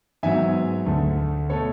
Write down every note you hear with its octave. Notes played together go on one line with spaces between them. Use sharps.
G#2 F#3 B3 E5 G#5
D2 D3 A3
B2 A3 A4 C#5